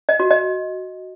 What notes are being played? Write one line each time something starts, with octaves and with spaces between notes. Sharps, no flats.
D#5
F#4
D#5